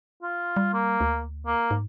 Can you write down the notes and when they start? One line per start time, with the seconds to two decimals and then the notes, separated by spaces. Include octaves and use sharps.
0.23 F4
0.57 G3
0.74 A#3
1.00 D2
1.47 A#3
1.71 G#2